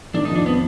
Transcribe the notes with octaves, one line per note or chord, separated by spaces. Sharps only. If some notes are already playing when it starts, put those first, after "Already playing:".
D#3 D4
D#4
F2
D4
B3